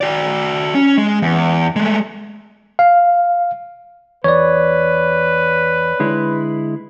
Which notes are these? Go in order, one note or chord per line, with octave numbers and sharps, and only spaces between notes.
F#4 D5
C#4
G#3
E2
G#3 A3
F5
E2 B4 C#5 D5
D3 G#3 E4